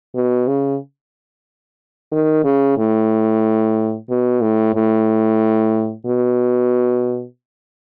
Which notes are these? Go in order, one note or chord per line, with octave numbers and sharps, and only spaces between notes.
B2
C#3
D#3
C#3
A2
B2
A2
A2
B2